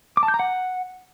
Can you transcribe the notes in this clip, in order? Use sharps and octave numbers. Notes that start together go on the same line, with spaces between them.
D6
A5
G6
A#5
F#5